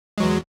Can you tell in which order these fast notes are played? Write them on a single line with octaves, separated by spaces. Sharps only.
G#3 F#3 E2